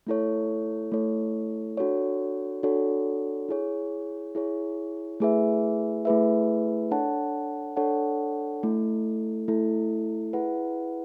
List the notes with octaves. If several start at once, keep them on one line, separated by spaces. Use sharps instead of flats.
A3 E4 A4 C#5
A3 E4 A4 C#5
D4 F#4 A4 C#5
D4 F#4 A4 C#5
E4 G#4 C#5
E4 G#4 C#5
A3 E4 G#4 B4 E5
A3 E4 G#4 B4 E5
D4 A4 C#5 F#5 A5
D4 A4 C#5 F#5 A5
A3 E4 A4
A3 E4 A4
E4 G#4 B4 F#5